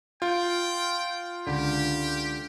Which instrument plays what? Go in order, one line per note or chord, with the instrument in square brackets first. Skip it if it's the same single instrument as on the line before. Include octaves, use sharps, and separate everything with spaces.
[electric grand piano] F4 [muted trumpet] G5
[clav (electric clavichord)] C#2 D3 [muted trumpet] G4